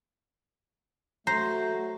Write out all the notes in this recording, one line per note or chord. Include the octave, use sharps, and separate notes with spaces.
F#3 A3 F#4 C5 A#5